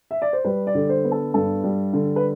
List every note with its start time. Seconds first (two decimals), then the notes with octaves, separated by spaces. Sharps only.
0.11 E5
0.22 D5
0.33 C5
0.45 G3 B4
0.67 D5
0.75 D3
0.89 C5
1.05 B3
1.12 A4
1.34 G2 A4
1.64 G3
1.93 D3
2.16 B4